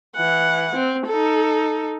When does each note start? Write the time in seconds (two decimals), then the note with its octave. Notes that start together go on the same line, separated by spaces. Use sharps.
0.16 E3 F#5
0.75 C4
1.07 D#4 A4